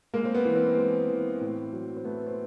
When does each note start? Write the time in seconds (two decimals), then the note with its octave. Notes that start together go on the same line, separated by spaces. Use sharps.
0.14 G#3 A#3
0.25 C4
0.34 B3
0.45 E3
0.56 C4
0.77 G#3
1.09 E3
1.41 A2
1.73 F#3
1.97 C4
2.05 A3 B3
2.27 C4